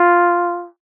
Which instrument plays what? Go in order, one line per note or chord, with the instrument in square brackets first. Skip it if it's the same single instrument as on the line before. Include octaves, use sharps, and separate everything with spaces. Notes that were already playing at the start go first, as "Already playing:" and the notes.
Already playing: [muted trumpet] F4